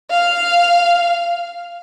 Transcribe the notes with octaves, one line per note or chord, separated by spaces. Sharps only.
F5